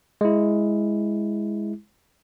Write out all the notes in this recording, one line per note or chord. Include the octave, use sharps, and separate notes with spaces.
G#3 E4